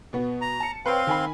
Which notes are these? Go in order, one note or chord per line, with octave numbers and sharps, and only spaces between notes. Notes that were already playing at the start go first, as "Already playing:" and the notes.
B2 B3
A#5
A5 C#7
C4 B4 C#5 F5 G5 C6
D#3 G#5 B5